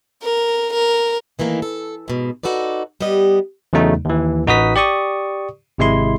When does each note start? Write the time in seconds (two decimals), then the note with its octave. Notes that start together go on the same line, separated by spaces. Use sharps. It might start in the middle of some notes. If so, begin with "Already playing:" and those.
0.23 A#4
0.73 A#4
1.39 D#3 E3 A3 A#3
1.62 A4
2.08 G#2 B2
2.43 D#4 F#4 A4 B4 D5
3.01 G3 B3 G4 D#5
3.73 E2 C#3 F#3 A3 D#4
4.05 D#2 E3
4.47 A1 D#4 F#4 B4 D#6 B6
4.76 G4 D5 C#6 D#6
5.78 G#1 C3 G#3 E4 C6